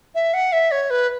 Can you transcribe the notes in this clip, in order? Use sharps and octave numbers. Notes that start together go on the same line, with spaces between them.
E5
F#5
E5
C#5
B4